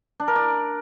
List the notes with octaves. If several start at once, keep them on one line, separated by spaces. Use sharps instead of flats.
D4
A#4
D5